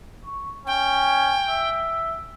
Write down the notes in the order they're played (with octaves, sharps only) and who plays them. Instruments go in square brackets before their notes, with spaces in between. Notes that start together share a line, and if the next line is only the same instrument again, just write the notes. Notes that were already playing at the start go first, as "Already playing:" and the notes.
[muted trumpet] C#6
[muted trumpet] C#4 [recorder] G5
[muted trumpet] E5